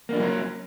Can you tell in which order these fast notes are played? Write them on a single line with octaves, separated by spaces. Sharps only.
A#3 D4 F3 F#3 C#4